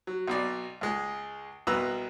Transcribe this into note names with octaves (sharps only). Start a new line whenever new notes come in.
F#3
B1 B2 D5
C#2 G#3
C2 B2 B4 A#5 B5 E6